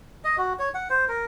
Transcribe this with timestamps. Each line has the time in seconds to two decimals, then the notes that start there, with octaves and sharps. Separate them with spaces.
0.24 D#5
0.38 F#4
0.59 C#5
0.74 F#5
0.90 C5
1.08 A#4